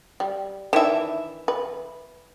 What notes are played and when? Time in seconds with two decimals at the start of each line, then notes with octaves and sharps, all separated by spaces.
0.20 G3
0.73 D#3 E3 D4 E5
1.48 B4